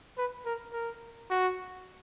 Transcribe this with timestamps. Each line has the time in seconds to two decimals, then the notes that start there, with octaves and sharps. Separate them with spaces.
0.17 B4
0.45 A#4
0.73 A#4
1.30 F#4